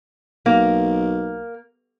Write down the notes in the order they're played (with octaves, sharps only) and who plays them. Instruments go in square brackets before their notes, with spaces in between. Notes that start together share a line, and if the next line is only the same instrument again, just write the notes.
[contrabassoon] B1 [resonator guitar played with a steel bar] A#3